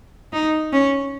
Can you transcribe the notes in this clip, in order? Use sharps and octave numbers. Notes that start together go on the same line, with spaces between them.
D#4
C#4